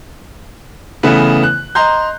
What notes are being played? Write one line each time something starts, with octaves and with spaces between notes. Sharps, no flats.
C#3 E3 A3 B3 B4
F#6
D#5 A#5 C6 G6